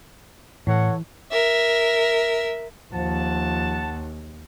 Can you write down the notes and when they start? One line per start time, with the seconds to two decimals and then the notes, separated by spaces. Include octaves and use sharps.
0.67 A2 E3 A4 C#5 F#5
1.31 A#4 E5
2.93 D#2 F3 F#5 A5